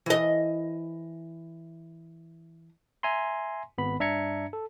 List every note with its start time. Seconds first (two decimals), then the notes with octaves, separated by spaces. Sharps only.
0.06 E3 D#5
3.03 E5 G#5 A#5 C6
3.78 G#1 B3 B5
4.00 G2 D4 E5 A#5 G#6 C#7
4.53 A4